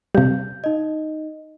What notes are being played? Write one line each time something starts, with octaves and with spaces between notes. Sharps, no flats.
C3 G3 F5 G6
D#4 D#5